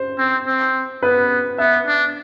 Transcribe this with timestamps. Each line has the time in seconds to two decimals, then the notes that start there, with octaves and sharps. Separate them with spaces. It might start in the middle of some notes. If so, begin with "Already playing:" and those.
Already playing: C5
0.18 C4
0.46 C4
1.03 B3 B4
1.58 B3 E5
1.87 D4